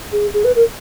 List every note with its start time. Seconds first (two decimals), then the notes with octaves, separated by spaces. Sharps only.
0.12 G#4
0.34 G#4
0.44 B4
0.56 A#4